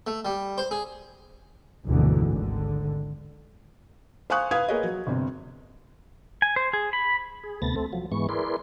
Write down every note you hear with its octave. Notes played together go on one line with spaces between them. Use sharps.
A3
G3
C5
G#4
F1 D2 G#2 B2 D3 E3
G#1 D3
C5 F5 G#5 C#6 D#6 F#6
B4 F5 D#6 G#6
A#3 G#4 A#4 B4 C#5 D#5
F#3
G1 C3
G#5
C5
G#4
B5
G#4
D2 C3 A3 B3 A6 A#6
A3 C4 A4
F3 F#3
G#2 E3 G#3 B3 C#6
E4 G#4 A#4 B4 D5 C6